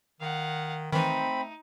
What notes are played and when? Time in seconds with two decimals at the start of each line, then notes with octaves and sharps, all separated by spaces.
0.21 D#3 F5 F#5
0.93 D#3 E3 A3 C4 D#4 B5